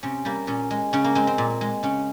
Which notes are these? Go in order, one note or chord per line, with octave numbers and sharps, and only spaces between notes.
C3 C#4
G3 A#3
A#2 C#4
G#3
C#3 C#4
A#3
G#3 C4
C4
A#2
G#3
C#3 C#4